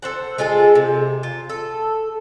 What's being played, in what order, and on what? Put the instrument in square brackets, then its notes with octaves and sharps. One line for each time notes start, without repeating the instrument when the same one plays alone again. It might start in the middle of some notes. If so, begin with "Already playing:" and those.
[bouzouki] A4 C5 F#5
G#3 F4 G#4 A4
C3
F4
A4